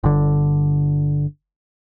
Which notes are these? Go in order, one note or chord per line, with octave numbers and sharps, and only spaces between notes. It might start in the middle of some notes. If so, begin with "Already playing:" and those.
G1 D3